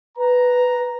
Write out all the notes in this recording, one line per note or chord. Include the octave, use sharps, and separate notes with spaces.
B4 A#5